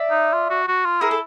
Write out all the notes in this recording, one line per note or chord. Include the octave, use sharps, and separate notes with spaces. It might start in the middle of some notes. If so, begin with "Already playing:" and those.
Already playing: D5 E5
D#4
F4
F#4
F#4
F4
E4 G#4 A#4
A4